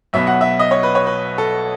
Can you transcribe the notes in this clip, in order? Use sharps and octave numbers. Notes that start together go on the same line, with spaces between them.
B1 B2 F#3 B3 E5
F#5
E5
D#5
C#5
B4
C#5
B4
A4